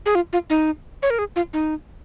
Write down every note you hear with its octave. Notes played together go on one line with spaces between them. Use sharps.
G#4
F4
F4
D#4
C#5
A#4
G#4
F4
D#4